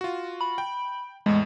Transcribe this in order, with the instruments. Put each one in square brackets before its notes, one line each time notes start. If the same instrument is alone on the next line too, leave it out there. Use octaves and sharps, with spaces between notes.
[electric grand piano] F4 F#4
[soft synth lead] B5
[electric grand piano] G5
[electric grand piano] E2 A2 [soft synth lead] G#3